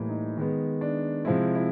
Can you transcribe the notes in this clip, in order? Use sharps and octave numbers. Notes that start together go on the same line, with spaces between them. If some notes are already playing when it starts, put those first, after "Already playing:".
Already playing: A2 E3 G3 A#3
D#4
D#3 G#3 B3
D4
C3 F3 G#3 E4
E4